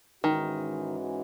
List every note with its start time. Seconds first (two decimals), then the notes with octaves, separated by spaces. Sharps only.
0.23 G#2 D#3 E3 G#3 C#4 F#4